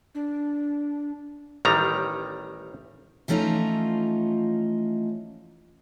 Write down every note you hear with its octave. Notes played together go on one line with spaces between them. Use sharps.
D4
A1 D#3 G3 A#5
E3 F3 A3 C#4 D#4 F4